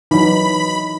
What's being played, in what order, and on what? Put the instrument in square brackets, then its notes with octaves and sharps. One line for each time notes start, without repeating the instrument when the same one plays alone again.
[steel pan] E3 F#3 [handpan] D#4 [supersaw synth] B5